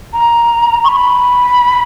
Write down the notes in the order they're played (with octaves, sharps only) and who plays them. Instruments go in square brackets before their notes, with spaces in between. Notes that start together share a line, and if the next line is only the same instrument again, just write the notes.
[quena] A#5
C#6
B5